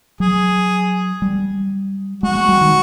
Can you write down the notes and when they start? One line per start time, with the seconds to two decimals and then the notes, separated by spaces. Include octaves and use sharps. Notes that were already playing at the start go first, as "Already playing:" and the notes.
0.20 F#3 G#4
1.22 G3
2.23 G#3 F#4
2.35 G#3
2.49 G3
2.61 D#3